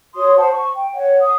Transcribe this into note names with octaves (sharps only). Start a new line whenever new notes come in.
F#4 C#5 C6 D#6
C5 F#5 A5
C#6
G5
C#5 F#5
D#6